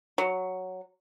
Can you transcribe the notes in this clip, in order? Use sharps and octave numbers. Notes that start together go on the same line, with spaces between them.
F#3